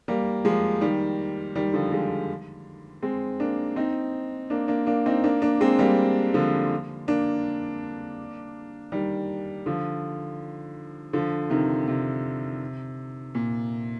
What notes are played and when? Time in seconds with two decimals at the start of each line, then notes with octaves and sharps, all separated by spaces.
0.08 G3 A#3
0.45 F3 G#3
0.81 D#3 G3
1.55 D#3 G3
1.74 D3 F3
1.92 F3 G#3
3.02 G#3 C4
3.40 A#3 D4
3.76 C4 D#4
4.50 A#3 D4
4.68 A#3 D4
4.86 A#3 D4
5.06 C4 D#4
5.24 A#3 D4
5.42 A#3 D4
5.61 G#3 C4
5.79 G3 A#3
6.34 D3 F3
7.08 A#3 D4
8.92 D#3 G3
9.66 D3 F3
11.13 D3 F3
11.50 C3 D#3
11.88 C3
13.35 A#2